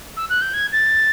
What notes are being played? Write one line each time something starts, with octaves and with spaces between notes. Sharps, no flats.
E6
F#6
G6
G#6
A6